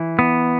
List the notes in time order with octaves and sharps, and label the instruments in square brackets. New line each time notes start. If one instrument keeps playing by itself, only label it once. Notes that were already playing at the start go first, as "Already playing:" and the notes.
Already playing: [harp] E3
[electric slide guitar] B3